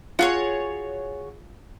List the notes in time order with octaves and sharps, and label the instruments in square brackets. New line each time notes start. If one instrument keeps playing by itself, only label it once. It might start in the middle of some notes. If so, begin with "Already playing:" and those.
[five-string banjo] F4 [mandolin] F#4 G#4 C#5